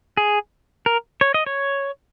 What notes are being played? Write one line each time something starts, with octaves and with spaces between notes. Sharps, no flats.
G#4
A#4
C#5
D#5
C#5